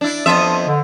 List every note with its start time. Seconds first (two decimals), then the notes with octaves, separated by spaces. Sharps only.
0.01 D4 E4
0.26 F2 B3 E5 A5 C6 D#6
0.66 D3